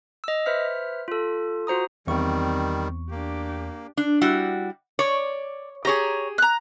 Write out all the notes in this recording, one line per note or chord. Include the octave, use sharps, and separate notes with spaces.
D#5 E6
B4 C5 E5 F6 B6
F4 A4
F4 F#4 C5 A#5 D#6
E2 D#3 G3 C4 C#6
A#3 D4 G4
D4
G3 E4 F#4
C#5 D5
G4 G#4 C#5 A#5
A#5 F#6